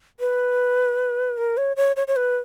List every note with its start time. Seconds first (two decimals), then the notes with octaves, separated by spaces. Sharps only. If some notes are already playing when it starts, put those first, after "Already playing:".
0.20 B4
1.38 A#4
1.57 C#5
1.77 C#5
1.96 C#5
2.08 C#5
2.16 B4